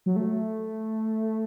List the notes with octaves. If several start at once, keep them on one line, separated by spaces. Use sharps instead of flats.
F#3
A3